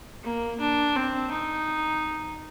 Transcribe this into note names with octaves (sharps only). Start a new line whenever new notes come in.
A#3
D4
C4
D#4